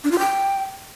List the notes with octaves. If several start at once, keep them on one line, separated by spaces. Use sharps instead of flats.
D4
F4
G5